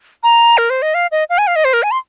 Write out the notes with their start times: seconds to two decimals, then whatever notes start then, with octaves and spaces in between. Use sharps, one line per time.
0.23 A#5
0.58 A#4
0.70 C5
0.82 D#5
0.94 F5
1.12 D#5
1.30 F5
1.38 G#5
1.47 F5
1.56 D#5
1.65 C5
1.73 A#4
1.83 G#5
1.91 C6